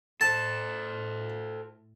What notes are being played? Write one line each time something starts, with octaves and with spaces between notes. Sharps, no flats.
A2 A4 C5 A5